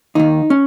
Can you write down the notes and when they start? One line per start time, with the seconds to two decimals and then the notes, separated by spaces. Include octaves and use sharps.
0.15 D#2 D#3 D#4
0.50 C#4